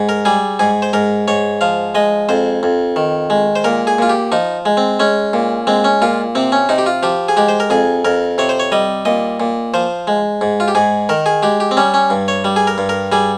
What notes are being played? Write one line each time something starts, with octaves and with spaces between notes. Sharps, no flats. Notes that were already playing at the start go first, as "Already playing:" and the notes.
Already playing: G#2
A#4
G3 G#4
G#2 G#4
C5
G#2 A#4
G#2 C#5
F3 F5
G#3 D#5
F2 C5
F2
D#3
G#3
C5
A#2 A#4
G#4
A#2 F4
G4
F3 D#4
G#3
C4
G#3 C#4
A#2
G#3 C4
C#4
A#2 F4
C3 C4
C#4
C3 D#4
G4
F4
F3 G4
G#4
G#3 G4
C5
A#4
F2 G#4
F2 A#4
C3 C#5
C5
C#5
G3 D#5
A#2 D#5
A#2
F3 C5
G#3
G#2
F4
G4
G#2 G#4
D#3 A#4
G#4
G#3 G4
G4
C4
G3 C#4
C#4
G2
C#5
G3
G#4
A#4
G2
A#4
G3 G#4